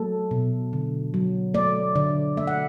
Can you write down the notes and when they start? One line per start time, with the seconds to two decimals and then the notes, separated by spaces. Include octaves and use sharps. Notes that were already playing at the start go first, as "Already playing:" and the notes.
Already playing: F#3 A3 A4
0.31 B2
0.73 D3
1.14 F#3
1.54 A3 D5
1.95 D3 D5
2.37 A3 E5
2.47 F#5